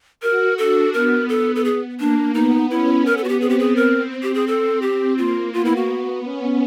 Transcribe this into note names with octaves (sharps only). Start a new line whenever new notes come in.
F#4 A#4
D4 A4
B3 A#4
A4
A4
G#4
A#3 D4
B3 D#4
C#4 E4
B3 A#4
A4
F#4
G4
C4 G#4
G4
G#4
A#4
G4
G#4
C4 A4
C4 G4
A#3 F4
B3 F4
E4
F#4
C#4